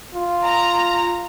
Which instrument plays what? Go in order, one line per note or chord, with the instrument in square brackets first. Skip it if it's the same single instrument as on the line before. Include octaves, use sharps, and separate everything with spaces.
[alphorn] F4
[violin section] A#5